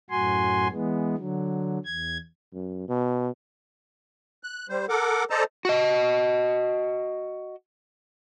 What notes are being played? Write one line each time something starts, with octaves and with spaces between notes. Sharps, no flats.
F#2 A2 F#4 G#5 C6
E3 G#3 B3
D3 F#3
E2 G#6
F#2
B2
F#6
G3 C5
A4 A#4 F#5 D6
A4 C5 D5 D#5 A5 A#5
F#4 D#5